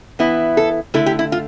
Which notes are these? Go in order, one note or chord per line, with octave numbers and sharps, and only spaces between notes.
E3 B3 E4
A4
D3 A3 E4 A4
G4
E4
F4